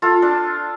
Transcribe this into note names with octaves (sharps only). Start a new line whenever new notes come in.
F4 A4
D4